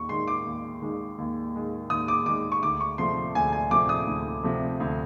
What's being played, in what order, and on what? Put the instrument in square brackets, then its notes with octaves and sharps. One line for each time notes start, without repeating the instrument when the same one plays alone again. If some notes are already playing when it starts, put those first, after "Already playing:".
Already playing: [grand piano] D#2 C#6
D#3 G#3 C6
D6
D#2
D#3 G#3
D#2
D#3 G#3
D#2 D#6
D6
D#3 G#3 D6
C#6
D2 D6
C#6
C3 F3 A3 C6
D2 G#5
G#5
C3 F3 A3 D6
D#6
D2
C3 F3 A3
D2